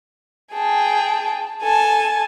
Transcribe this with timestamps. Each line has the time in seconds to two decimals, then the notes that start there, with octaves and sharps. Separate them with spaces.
0.54 G#4 G5 A5
1.63 A4 G#5 A5